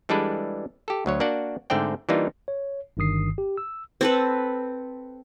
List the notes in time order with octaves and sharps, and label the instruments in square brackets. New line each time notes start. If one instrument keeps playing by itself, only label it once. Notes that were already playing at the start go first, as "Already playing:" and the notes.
[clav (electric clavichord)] E3 G3 G#3 D4 A4 B4
G4 A4
D2 F#3 C#5
A#3 D4 F#4 D5 F#5
G#2 D3 A3 C4 D5 G5
E3 G3 A#3 D4 D#4 F4
[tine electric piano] C#5
G1 G2 D#3 D#6 C7
G4
E6
[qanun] C4 A4 B4